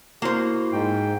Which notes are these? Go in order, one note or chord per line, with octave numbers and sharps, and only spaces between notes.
A#3 E4 F#4 C5
G#2 G5